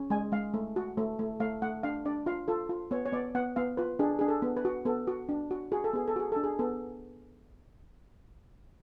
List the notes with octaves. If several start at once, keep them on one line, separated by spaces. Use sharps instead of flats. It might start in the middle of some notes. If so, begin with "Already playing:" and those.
Already playing: C#4
G#3 G#5
G#3 F5
A3
F#4
A3
A3
A3 F5
A3 F#5
D4 F5
D4 D5
F4 F5
F4 A4
F4
B3 C#5
C#5
B3 D5
B3 F#5
B3 F5
F4 B4
D4 G#4
D4 G#4
A4
B3
B4
F#4
B3 A4
F#4
D4
F#4
F#4 G#4
A4
B3 G#4
A4
F#4 G#4
D4 A4
G#4
B3 A4